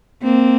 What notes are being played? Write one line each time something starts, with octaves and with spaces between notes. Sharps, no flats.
A#3 C4